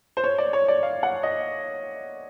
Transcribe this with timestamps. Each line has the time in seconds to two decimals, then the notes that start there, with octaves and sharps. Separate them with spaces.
0.17 C5
0.24 C#5
0.38 D5
0.53 C#5
0.68 D5
0.83 F5
1.03 F#5
1.23 D#5